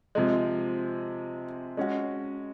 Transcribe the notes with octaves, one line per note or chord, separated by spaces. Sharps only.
C3 F3 G#3
G#3 C#4 F#4